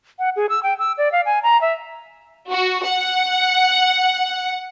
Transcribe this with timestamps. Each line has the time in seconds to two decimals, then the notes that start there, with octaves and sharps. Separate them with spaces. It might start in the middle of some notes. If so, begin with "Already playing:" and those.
0.19 F#5
0.36 G#4
0.49 E6
0.63 G5
0.79 E6
0.98 D5
1.12 F5
1.26 G#5
1.43 A#5
1.61 E5
2.51 F#4
2.87 F#5